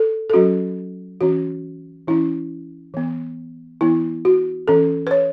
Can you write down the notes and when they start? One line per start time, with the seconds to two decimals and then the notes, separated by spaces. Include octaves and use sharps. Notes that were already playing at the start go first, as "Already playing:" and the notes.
Already playing: A4
0.30 A4
0.34 F#3 C#4 F#4
1.21 E3 C#4 F#4
2.07 E3 C#4 E4
2.94 E3 B3
3.81 E3 B3 E4
4.25 F#4
4.68 E3 C#4 A4
5.07 B4
5.11 C#5